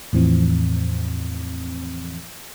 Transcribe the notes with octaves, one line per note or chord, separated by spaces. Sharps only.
E2 A2 E3 F3 C4